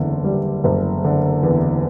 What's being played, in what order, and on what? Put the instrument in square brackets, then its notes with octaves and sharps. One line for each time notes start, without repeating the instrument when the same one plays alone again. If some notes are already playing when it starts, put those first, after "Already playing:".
Already playing: [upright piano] F#1 E2 D3
G3
F#1
D3
E2